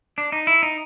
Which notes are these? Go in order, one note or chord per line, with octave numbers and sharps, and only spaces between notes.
D4
D#4
E4
D#4